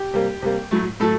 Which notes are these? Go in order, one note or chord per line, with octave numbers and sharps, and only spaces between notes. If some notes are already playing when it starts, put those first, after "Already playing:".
Already playing: G4
C3 G3 A#3
C3 G3 A#3
A2 F#3 A3
A2 F#3 A3 A4